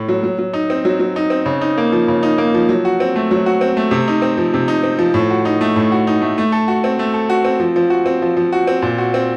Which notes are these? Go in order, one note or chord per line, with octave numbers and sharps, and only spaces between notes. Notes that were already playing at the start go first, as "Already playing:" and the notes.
Already playing: A2
F#3
F#3
F#3
D#4
C4
F#3
F#3
D#4
C4
C#3
D#4
A#3
F3
C#3
D#4
A#3
F3
F#3
F#4
C4
A3
F#3
F#4
C4
A3
C3
D#4
C4
F3
C3
D#4
C4
F3
A2
F#4
D#4
A3
A2
F#4
D#4
A3
A3
A4
F#4
C4
A3
A4
F#4
C4
F3
F3
F#4
C4
F3
F3
F#4
C4
A#2
F#4
C4